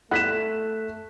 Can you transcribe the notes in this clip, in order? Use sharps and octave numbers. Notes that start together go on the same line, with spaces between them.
A3 B3 E4 A4 F#6 B6 E7